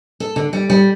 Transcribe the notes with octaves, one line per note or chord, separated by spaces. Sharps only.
A4
D3
G3
G3